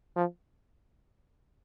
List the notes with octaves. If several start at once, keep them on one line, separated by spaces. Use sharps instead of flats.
F3